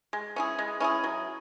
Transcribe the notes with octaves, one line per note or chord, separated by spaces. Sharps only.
G#3
C#4 E4 G#4
G#3
C#4 E4 G#4
F#3